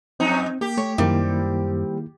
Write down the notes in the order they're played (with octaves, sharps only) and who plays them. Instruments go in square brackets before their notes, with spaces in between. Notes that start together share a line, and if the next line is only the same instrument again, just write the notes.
[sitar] F2 D#4 [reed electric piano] C4
[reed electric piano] A#3 [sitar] G4
[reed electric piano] A3 [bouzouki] C#5
[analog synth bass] F#2 [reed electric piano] D#3 A#3 E4 [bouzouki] G3 C4